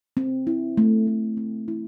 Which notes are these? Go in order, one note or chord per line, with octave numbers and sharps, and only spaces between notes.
C4
E4
A3
A3
C4
E4